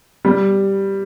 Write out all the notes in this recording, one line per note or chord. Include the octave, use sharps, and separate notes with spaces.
G3